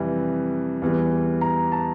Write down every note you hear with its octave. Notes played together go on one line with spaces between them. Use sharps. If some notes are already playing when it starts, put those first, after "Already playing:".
Already playing: F2 C3 E3 G3
E2 E3 G3
A#5
A5